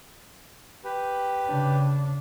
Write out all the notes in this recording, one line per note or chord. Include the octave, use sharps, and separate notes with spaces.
G4 B4
C#3 D4